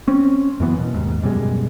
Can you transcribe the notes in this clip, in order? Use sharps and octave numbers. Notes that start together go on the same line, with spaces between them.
C4 C#4
F#2 E3 B3
B2
D#2 G#2
F#2 B2 G3 G#3